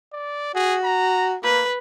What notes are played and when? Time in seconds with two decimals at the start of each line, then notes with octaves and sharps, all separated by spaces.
0.13 D5
0.55 F#4 G#4
0.84 A#5
1.43 A#3 B4